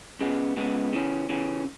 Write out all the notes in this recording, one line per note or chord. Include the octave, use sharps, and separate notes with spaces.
C#2 C#3 G#3 B3
C#2 C#3 G#3 B3
C#3 E3 C#4
C#3 E3 C#4